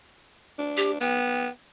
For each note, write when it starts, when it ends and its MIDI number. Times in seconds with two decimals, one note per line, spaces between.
0.59 0.96 62
0.77 0.92 67
1.01 1.48 59
1.01 1.49 79